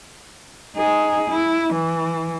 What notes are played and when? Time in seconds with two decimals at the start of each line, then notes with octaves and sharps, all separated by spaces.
0.76 D#4 G#4
1.29 E4
1.73 E3